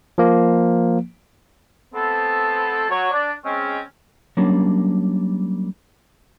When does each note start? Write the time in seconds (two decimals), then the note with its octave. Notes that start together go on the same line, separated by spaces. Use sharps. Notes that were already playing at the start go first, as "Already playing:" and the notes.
0.18 F3 A#3
1.94 A3 B3 C4 A4
2.90 F#3 C#5
3.11 D4
3.44 G#3 C4 C#4
4.37 F#3 G3 A#3 C#4 D4